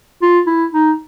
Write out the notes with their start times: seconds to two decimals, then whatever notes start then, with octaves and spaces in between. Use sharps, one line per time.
0.22 F4
0.47 E4
0.73 D#4